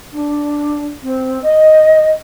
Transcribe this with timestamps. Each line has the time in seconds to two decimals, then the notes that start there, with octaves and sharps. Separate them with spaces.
0.12 D4
1.02 C4
1.42 D#5